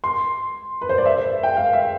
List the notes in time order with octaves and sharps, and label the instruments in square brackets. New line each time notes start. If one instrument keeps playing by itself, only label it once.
[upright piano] C6
B4
C5
D5
E5
C5
G5
F5
E5